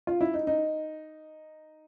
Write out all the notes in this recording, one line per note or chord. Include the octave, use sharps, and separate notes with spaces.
F4
E4
D#4
D#4